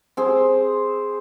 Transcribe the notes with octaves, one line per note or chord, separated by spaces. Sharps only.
C4 G#4